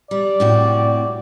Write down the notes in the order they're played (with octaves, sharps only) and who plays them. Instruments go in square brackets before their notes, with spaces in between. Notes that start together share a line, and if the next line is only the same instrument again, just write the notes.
[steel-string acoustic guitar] G3 [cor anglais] D5
[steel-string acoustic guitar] A2 C3 F#4